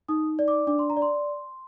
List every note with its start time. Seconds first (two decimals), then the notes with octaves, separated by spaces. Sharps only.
0.08 D#4 D#6
0.39 D5
0.48 D6
0.67 D4 D6
0.79 C6
0.90 A#5
0.97 D5
1.02 C6